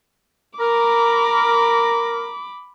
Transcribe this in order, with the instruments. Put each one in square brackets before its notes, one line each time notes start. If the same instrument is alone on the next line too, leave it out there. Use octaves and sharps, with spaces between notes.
[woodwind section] A#4 A#5 [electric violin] B5 D6